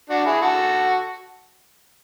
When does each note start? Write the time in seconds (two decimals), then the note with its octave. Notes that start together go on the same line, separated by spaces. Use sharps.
0.10 D4 F#4
0.26 E4 G#4
0.41 F#4 A4